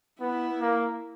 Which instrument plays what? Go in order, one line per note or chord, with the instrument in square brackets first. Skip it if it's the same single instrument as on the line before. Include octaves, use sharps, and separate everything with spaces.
[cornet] B3 [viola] E4
[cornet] A#3